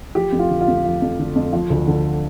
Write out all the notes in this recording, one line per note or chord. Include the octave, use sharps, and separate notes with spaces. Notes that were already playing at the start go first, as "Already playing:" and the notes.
F3 G4
F2
F4
D3
F4
F2
F3
F2
D3
F2
F3
D2
D3